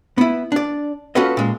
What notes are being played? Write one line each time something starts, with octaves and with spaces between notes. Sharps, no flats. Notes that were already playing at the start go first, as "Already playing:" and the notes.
B3 E4
D4 D5
C#4 F4 F#4 A4 B4 D#5
A#2 G#3